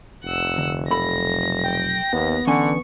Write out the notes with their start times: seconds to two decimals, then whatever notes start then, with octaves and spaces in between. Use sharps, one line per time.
0.25 F1 F#5 E6
0.58 D3
0.91 B1 A4 B5 A#6
1.63 G5
2.13 D#2 B3
2.47 D3 E3 C#4 G#5 C#6